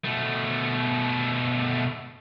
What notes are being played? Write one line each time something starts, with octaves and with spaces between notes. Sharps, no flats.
B2 A3